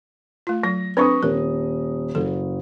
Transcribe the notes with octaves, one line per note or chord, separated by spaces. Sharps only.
A3 F4
F#3 A#6
C4 D4 B4 C5 C#6 D#6
D#1 A#4
F#1 A4